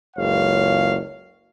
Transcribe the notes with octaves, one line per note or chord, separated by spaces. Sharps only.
F#1 C#2 C#5 F5